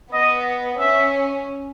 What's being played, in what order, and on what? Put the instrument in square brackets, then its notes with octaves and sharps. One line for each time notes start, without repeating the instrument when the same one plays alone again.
[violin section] B3 [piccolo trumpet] D#5
[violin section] C#4 [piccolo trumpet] E5